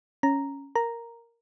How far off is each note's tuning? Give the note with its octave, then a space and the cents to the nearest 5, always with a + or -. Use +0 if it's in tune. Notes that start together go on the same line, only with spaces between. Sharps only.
C#4 +0 A#5 +0
A#4 +0 A#5 +0